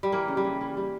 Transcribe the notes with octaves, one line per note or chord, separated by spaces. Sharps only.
G3
E3 A#3
C#3
G3
E3
E3
G3